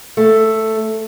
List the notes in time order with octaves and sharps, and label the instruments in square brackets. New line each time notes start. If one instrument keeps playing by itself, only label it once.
[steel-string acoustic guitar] A3